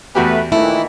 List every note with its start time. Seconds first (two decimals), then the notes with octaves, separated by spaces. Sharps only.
0.15 E2 A3 B3 F#4 G4 B4
0.52 A#2 D#3 E3 A3 E4